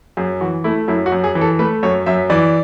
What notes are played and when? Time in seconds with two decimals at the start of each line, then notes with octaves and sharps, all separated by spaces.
0.17 F#2 G#4
0.41 E3 F#4
0.64 A3 E4
0.88 F#2 E4
1.06 F#4
1.12 F#2
1.24 G#4
1.35 E3
1.41 A4
1.59 A3 B4
1.83 F#2 C#5
2.06 F#2 E5
2.30 E3 D5